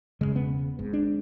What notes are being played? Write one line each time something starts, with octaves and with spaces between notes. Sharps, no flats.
E1 E2 C#3 G#3
B3
G#1 G#2
D4